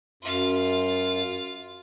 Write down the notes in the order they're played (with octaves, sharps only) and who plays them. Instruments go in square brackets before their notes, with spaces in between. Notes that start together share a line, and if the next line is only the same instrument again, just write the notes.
[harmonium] F#2 [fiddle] F4 F5